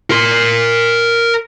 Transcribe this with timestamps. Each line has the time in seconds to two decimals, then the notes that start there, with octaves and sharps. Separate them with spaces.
0.10 A#4 C6